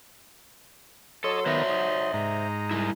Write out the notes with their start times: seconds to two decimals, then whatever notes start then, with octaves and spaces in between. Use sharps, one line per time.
1.24 F#3 A4 C#5 D#5 C6
1.46 D#3 B3 A#4 C5 D5 E5
1.70 D#4
2.13 G#2 D#4 A#5
2.71 G3 E4